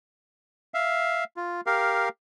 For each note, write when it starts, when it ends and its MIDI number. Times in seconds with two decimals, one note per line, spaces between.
0.74 1.24 76
0.74 1.24 77
1.37 1.61 65
1.66 2.09 67
1.66 2.09 70
1.66 2.09 77